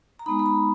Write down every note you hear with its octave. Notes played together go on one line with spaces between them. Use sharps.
A#5
G#3 B3 D#4 B5
B5
A#5